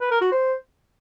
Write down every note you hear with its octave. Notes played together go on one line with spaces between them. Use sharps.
B4
A#4
F#4
C5